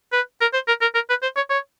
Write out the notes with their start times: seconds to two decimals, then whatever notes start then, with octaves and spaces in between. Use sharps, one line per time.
0.12 B4
0.41 A#4
0.53 C5
0.68 A#4
0.82 A#4
0.95 A#4
1.09 B4
1.22 C5
1.36 C#5
1.50 C#5